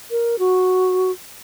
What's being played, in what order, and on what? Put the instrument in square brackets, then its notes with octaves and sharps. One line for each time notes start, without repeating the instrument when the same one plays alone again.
[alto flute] A#4
F#4